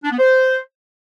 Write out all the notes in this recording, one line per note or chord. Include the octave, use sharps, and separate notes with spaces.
D4
B3
C5